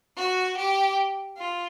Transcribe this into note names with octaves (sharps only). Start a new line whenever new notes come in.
F#4
G4
F4